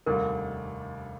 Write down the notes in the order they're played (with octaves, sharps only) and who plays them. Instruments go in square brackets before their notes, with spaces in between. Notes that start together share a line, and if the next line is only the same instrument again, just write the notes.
[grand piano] F1 D#2 D3 G3 [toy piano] A#4